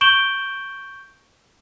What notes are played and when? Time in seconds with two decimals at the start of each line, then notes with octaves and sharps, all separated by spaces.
0.01 C#6 G6 D7 E7 F#7 G7